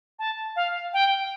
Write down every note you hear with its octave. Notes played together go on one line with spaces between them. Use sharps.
A5
F5
G5